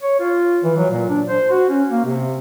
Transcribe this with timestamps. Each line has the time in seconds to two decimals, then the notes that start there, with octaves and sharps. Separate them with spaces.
0.02 C#5
0.20 F4
0.64 E3
0.77 F#3
0.90 A#2
1.09 D4
1.27 C5
1.51 F#4
1.69 C#4
1.90 A#3
2.05 C3